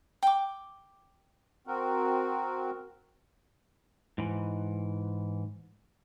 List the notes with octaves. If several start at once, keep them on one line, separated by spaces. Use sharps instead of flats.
G5 D6
C4 F#4 A#4
G#2 E3